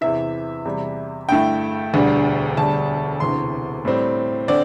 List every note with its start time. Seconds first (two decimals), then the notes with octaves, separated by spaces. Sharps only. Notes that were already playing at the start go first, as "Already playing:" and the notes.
0.01 E2 C3 E3 E5
0.65 E2 C3 G3
1.29 G2 D3 A3 E4 G5
1.94 E1 D2 D3 G3
2.57 E1 D2 D3 G3 A5
3.20 E1 D2 C3 E3 C6
3.85 A2 G3 C4
4.48 D3 C4 D5